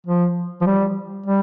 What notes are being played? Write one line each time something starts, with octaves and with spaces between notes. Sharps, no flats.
F3
F3
G3
G3